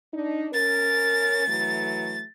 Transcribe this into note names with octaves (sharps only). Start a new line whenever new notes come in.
D4 D#4
C#4 A#4 A6
E3 F#3 A3